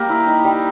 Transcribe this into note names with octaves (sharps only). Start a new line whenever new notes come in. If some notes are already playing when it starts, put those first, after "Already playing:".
Already playing: G3 A#3 G4 A#4
E4
D#4
G3